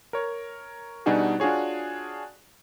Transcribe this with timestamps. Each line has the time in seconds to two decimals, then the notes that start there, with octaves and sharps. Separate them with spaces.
0.13 A#4 C#5
1.06 B2 G3 D4 D#4 F#4 G#4
1.40 D4 F4 F#4 G#4 C#5